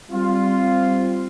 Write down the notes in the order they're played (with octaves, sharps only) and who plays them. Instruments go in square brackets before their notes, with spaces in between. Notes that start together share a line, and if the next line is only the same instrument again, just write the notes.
[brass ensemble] G3 C4 F4